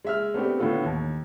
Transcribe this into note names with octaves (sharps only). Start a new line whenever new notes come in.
G#3 E5 F6
A3 B3 C4 D4 G4
A2 D3 B3 F4 A4
D#2